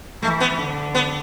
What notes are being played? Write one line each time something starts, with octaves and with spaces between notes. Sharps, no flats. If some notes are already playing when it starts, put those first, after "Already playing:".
E3 A3
B3
D3
B3